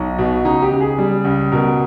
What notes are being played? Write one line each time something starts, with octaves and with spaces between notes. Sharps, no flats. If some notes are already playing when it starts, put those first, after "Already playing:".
Already playing: B1 D#4
B2
C#2 D#4
G4
C#2
G#4
G3
C#2
B2 A#4